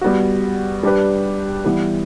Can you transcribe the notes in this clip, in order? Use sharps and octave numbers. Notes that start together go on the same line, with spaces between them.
G3 B3 F#4
G3 D4 G4 B4
E3 G3 B3